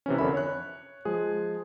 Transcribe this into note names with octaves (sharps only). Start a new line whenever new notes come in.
C3 E3 C#4
F2 D3 C#4 A#4 E5 B5
C#5 F#6
F3 G#3 G#4